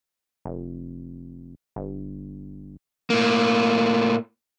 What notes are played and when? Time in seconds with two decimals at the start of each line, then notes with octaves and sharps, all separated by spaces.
0.45 F1
1.76 G1
3.10 A2 A#3